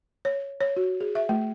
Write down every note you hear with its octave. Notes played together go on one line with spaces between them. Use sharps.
C#5
C#5
F#4
G#4
E5
A3